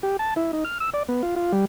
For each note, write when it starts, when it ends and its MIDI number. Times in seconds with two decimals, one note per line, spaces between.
0.03 0.17 67
0.19 0.34 81
0.36 0.51 64
0.53 0.64 63
0.65 0.78 89
0.80 0.90 88
0.94 1.03 74
1.08 1.22 59
1.23 1.35 65
1.36 1.52 65
1.52 1.65 55